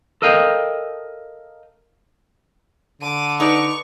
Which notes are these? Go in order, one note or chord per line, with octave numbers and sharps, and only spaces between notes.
A4 A#4 D#5 F5 G5
D3 D6 D#7
D#4 B4 D5 C#6 F7